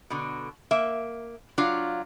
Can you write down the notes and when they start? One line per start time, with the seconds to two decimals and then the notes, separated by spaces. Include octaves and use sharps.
0.10 B2 D3
0.71 A#3 E5
1.58 F#3 D4 F4 F5